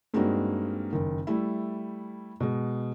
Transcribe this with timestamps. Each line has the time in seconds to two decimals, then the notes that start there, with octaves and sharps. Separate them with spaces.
0.14 G2 G#3 A#3 C4 D#4 F#4
0.93 F#1 D#3
1.27 G3 A3 E4
2.40 B2 G#3